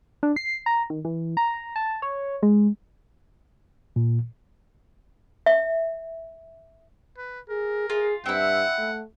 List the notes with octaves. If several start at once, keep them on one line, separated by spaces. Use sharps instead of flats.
D4
C7
A#5
D#3
E3
A#5
A5
C#5
G#3
A#2
E5
B4
G#4 A#4
F4 G#4
G2 C4 E4 F#5
A3